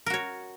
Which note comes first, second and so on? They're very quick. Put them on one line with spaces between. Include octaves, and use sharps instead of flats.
A#4 F#4 C#5